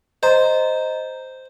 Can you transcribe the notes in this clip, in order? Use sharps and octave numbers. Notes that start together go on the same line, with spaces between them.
C5 D#5 A#5